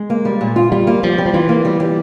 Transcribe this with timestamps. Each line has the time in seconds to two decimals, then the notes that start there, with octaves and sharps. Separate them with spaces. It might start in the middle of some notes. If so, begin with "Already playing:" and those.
Already playing: G#3
0.10 A#3
0.25 G3
0.41 A#2
0.56 F4
0.72 G3 F4
0.87 A#3
1.03 F3 G3
1.18 G3
1.26 F3
1.34 E3 F4
1.49 A#3
1.65 G3
1.80 G3